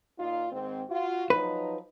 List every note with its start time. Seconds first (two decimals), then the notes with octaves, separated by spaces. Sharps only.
0.19 A#2 D#4 F4
0.51 G#2 D#3 C4
0.89 F4 F#4
1.30 F3 F#3 D#4 B4